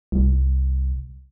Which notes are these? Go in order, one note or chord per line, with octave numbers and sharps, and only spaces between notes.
C2